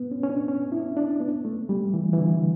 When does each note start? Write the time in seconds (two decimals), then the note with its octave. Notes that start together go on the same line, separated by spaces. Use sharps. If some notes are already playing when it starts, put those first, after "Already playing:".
Already playing: B3
0.11 C#4
0.23 C#4
0.30 D4
0.48 C#4
0.72 E4
0.97 D4
1.20 B3
1.45 A3
1.69 G3
1.94 E3
2.13 E3
2.18 D3